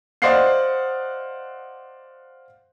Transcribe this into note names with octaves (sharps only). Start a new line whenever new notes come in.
C5 D5 D#5 F5 F#5 C7